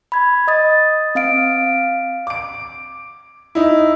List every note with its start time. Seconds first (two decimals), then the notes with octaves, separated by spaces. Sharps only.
0.12 B5 G#6
0.47 D#5 D#6 A6
1.15 C4 F5 D7
2.27 D6 D7
3.55 D#4 E4